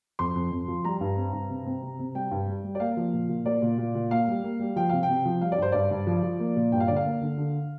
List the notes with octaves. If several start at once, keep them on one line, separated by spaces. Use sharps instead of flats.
F2 C6
F2
F2
F3
G3 A#5
G2
C4
G2
C3
C4
C3
C3
G3 G5
G2
G3
G3
D5
A#3 F5
F3
A#2
A#2
A#3 D5
A#2
A#2
A#2
A#3 F5
G3
A#3
G3
F3 G5
C3 F5
G5
C3
F3
G3 F5
D5
G2 C5
G2 D5
G2
F3
F3
A#3
A#2
G2 G5
F5
D3 D5
F5
A#3
D3
D3